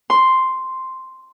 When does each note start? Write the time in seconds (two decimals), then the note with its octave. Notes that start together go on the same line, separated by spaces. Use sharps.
0.10 C6